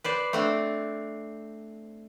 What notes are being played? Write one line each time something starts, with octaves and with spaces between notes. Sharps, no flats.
B4 C5 D5
A3 C4 D4